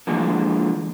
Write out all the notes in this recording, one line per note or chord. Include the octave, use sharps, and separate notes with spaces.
D3 E3 F3 G#3 A#3